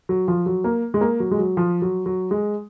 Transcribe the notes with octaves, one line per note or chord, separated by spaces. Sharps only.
F#3
F3
F#3
A#3
G#3
A#3
F#3
G#3
F#3
F3
F#3
F#3
G#3